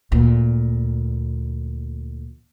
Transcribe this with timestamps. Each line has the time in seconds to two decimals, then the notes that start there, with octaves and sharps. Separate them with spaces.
0.12 D2 A#2